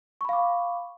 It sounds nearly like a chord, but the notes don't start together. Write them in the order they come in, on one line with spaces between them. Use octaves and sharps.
C#6 B5 F5 D6